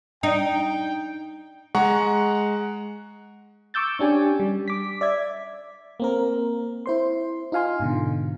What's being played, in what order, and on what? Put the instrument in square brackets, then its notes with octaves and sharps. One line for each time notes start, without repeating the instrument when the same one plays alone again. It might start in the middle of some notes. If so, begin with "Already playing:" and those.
[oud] D#4 [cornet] G5
[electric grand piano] G#3 F#5 A#5 C#6
[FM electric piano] C#6 D6 E6 G6 A6
C#4 D4 G4 G#5
G3
D6 B6
D5 E5 G#6
A#3 C4 A#4
E4 C5 C6
D#4 F4 F5 G#5 C6
G#2 B2 D3